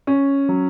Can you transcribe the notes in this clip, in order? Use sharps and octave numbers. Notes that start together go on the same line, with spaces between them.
C#4
F#3